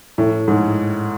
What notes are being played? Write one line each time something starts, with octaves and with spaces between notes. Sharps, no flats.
A2
G#2